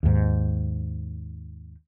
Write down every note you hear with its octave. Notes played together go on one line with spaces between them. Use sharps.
D#2 G#2